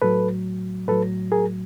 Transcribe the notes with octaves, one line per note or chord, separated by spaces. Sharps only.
A2 F#3 A4 B4
A2 F#3 A4 B4
G#4 A#4